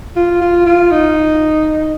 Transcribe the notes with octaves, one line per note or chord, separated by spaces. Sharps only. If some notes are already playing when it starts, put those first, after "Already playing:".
F4
F4
F4
D#4